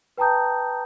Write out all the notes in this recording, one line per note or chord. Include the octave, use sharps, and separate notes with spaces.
B4 G5 A5 A#5 D#6 G6